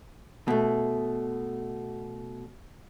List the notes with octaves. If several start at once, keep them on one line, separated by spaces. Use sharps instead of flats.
B2 A3